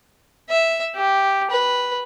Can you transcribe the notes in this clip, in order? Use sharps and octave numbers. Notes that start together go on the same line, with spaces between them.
E5
G4
B4